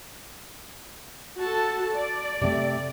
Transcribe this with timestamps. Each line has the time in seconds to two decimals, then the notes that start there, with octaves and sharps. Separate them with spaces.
1.39 F#4 A4 A5
1.93 D5
2.42 C3 A3